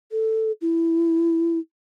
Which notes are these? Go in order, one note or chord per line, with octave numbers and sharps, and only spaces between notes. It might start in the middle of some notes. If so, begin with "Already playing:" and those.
A4
E4